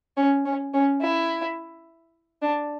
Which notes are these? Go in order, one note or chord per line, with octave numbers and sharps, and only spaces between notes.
C#4
C#4
C#4
E4
D4